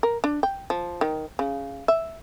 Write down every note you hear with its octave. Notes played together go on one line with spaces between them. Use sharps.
A#4
D4
G5
F3
D#3
C#3
E5